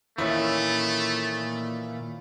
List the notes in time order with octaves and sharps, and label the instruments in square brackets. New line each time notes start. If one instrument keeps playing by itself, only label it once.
[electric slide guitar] A#2 D#3 E3 [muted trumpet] A3 [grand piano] C#4 E4